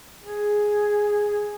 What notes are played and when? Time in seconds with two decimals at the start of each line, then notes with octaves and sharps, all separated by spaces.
0.24 G#4